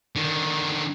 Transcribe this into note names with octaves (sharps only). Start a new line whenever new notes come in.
D3 D#3